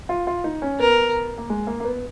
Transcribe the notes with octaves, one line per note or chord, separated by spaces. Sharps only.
F4
F4
D#4
C#4
B3 A#4
A#3
G#3
A#3
A#3
B3